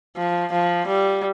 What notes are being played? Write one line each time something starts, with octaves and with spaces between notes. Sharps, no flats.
F3
F3
G3